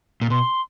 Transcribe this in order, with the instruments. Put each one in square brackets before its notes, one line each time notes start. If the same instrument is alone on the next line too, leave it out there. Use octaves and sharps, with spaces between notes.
[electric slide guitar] A#2
[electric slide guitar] B2 [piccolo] C6